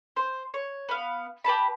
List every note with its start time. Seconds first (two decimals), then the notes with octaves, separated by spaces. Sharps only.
0.16 C5
0.54 C#5
0.89 B3 F5
1.44 G4 B4 A5 B5